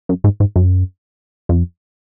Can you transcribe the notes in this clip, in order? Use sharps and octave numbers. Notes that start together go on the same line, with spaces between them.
F#2
G#2
G#2
F#2
F2